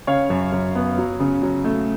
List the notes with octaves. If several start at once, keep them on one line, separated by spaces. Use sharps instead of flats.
C#3 C#5 F5
F#2
F#2
B3
F#3
C#3
F#3
A3